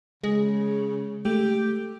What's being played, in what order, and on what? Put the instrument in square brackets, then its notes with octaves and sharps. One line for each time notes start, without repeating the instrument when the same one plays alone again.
[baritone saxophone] C#3 [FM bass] G#3
[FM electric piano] A3 [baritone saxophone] G4